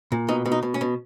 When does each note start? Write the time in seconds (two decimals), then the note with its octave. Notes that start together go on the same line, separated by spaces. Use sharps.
0.12 A#2
0.28 B2 D#4
0.45 B2
0.52 D#4
0.63 B2
0.74 C#4
0.81 B2